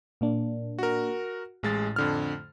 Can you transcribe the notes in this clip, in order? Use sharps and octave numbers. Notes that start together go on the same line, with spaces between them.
A#2 A#3 D4
F#4 A#4
A1 A2 G#3 A6
F2 D3 F6